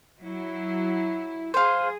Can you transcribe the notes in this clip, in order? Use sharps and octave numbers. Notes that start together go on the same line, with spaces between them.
F#3 E4
F4 G#4 C5